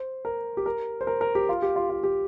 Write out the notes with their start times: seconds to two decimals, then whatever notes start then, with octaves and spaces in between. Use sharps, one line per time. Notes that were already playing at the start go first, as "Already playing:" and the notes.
Already playing: C5
0.25 A#4
0.57 G4
0.66 A#4
1.01 C5
1.07 A#4
1.21 A#4
1.35 G4
1.49 F4
1.62 G4
1.76 F4
1.90 F4
2.04 G4